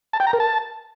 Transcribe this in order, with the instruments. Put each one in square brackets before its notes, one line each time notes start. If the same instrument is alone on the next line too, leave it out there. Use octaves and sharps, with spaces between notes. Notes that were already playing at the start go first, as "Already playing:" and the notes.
[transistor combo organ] A5
G5
A#5
A#4
A5